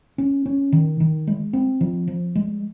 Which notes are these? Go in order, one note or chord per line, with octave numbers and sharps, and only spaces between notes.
C#4
C#4
D#3
D#3
G#3
C4
F3
F3
G#3